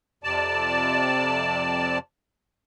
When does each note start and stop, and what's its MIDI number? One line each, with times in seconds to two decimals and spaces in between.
0.24 1.98 41
0.24 1.98 48
0.24 1.98 74
0.24 1.98 81